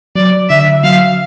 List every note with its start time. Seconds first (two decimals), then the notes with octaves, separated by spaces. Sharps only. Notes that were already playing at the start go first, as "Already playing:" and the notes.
0.15 F#3 D5
0.49 D3 E5
0.84 F#3 F5